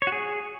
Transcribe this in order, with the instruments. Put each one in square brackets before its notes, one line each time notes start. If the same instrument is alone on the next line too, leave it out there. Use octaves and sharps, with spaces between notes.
[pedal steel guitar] C#5
F#4
G#4